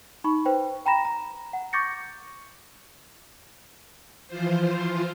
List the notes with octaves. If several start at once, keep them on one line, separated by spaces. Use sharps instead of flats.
D#4 B5 C#6
B4 C5 G5
G5 A#5 B5 A#6 E7
A#5
F#5
C#6 D6 G6 A6 A#6 C#7
E3 F3 F4 C5